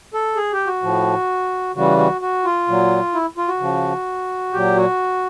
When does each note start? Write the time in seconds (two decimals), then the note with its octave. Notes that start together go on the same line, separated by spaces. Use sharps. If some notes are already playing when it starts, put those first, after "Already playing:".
0.14 A4
0.36 G#4
0.52 G4
0.67 F#4
0.82 A2 F3
1.75 C#3 E3 G3 F#4
1.98 F#4
2.21 F#4
2.45 F4
2.68 A#2 F#3
3.14 E4
3.37 F4
3.48 F#4
3.60 C#3 F3
4.53 A#2 F#3 G4
4.77 F#4